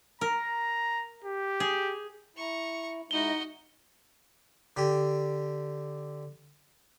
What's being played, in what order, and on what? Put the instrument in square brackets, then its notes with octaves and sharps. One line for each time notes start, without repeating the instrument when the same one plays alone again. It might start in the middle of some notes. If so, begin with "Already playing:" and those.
[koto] A#4 [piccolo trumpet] A#5
[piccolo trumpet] G4
[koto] G#4
[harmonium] E4 [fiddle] A#5 C#6
[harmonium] G#3 E4 [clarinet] D#4 [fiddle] F#4 D#5 [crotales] G7
[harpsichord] D3 G4